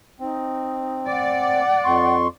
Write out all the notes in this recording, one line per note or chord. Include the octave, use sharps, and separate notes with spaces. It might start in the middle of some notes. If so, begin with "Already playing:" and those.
C4 D#4
D5 F#5
F2 C6 C#6